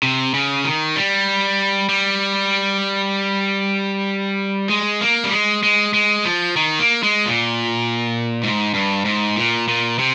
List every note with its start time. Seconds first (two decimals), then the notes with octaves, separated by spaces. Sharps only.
0.03 C3
0.34 C#3
0.65 D#3
0.96 G3
1.89 G3
4.69 G#3
5.01 A#3
5.24 G3
5.32 G#3
5.63 G#3
5.94 G#3
6.25 F3
6.56 D#3
6.80 A#3
7.03 G#3
7.26 A#2
8.43 G#2
8.74 G2
9.05 G#2
9.36 A#2
9.68 A#2
9.99 C3